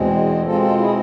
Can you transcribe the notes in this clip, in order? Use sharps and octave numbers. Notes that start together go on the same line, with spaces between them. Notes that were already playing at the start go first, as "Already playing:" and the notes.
Already playing: E2 B2 G#3 C4
B2 G#3 C4 F4 A4
F4 A4
E4 G#4